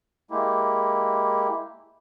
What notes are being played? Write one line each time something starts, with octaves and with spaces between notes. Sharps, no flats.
G#3 A#3 E4 G4